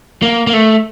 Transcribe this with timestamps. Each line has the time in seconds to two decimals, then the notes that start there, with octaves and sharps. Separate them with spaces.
0.22 A#3
0.47 A#3
0.54 A3